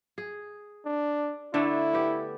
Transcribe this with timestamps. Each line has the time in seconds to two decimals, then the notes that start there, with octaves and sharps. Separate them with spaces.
0.18 G#4
0.85 D4
1.54 D3 A3 D4 E4
1.93 B3 G4